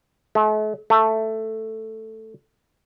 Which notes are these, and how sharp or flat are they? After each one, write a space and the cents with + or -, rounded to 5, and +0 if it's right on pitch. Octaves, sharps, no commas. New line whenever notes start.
A3 -45
A3 +5